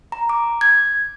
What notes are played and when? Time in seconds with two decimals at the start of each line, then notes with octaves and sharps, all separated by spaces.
0.12 A#5
0.29 D6
0.61 G#6